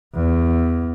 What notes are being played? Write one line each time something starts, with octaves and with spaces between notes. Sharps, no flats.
E2